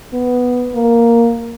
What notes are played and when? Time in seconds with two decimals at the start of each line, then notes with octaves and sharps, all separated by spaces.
0.13 B3
0.74 A#3